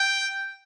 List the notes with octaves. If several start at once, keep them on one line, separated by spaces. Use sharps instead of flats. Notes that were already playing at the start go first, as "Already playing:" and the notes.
Already playing: G5